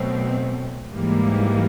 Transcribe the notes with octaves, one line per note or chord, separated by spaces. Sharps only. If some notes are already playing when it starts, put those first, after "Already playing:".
Already playing: B2 F#3 A3 C4
G#2 E3 G3 A#3